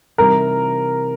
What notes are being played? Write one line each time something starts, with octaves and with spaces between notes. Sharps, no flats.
C3 E3 G3 C4 D#4 A#4